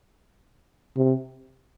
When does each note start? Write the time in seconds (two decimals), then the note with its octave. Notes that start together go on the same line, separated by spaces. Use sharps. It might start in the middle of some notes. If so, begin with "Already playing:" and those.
0.97 C3